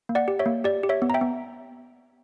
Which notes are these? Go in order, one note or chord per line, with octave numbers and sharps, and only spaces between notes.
A#3
D5 F#5
G4
C#5 E5
A#3
G4 D5
G4
C#5 E5
B3
A#5
E5 G5
B3